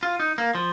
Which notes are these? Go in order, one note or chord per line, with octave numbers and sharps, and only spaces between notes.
F4
D#4
A#3
F3